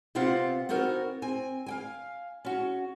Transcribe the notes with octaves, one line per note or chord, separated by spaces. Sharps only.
C3 B3 C4 F4 F5 F#5
B3 C4 D#4 F#4 A#4
C4 G#5
F5 G5 G#5
C#4 F#4